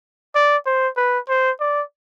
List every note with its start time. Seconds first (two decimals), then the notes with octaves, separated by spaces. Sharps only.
0.35 D5
0.66 C5
0.97 B4
1.29 C5
1.60 D5